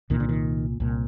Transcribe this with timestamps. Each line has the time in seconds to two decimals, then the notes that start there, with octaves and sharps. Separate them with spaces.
0.10 C2 A#2 D#3
0.20 D3
0.29 D#3
0.80 C2 A#2